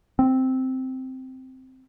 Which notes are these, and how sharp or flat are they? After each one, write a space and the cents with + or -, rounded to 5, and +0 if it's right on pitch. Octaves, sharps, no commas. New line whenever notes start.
C4 -5